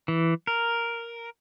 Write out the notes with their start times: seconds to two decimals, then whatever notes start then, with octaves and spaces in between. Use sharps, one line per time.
0.08 E3
0.47 A#4